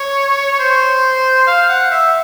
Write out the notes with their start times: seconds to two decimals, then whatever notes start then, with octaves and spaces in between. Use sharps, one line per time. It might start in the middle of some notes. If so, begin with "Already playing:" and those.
Already playing: C#5
0.59 C5
1.47 F5
1.69 F#5
1.91 E5